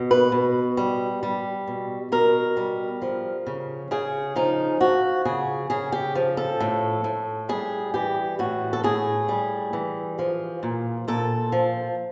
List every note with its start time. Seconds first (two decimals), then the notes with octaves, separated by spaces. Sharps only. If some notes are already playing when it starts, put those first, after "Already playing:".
Already playing: B2
0.11 B4
0.32 B2
0.77 G3
1.23 G3
1.67 B2
2.12 B2 A#4
2.57 G3
3.02 F3
3.47 C#3
3.91 C#3 G#4
4.36 F3 D#4
4.80 F3 F#4
5.25 C#3 G#4
5.70 C#3 G#4
5.92 G4
6.15 F3
6.37 A4
6.60 A2
7.04 A2
7.49 G3 G#4
7.94 E3 G4
8.39 A2 F#4
8.73 A4
8.84 A2 G#4
9.29 G3
9.73 E3
10.19 F3
10.63 A#2
11.08 A#2 A4
11.52 F3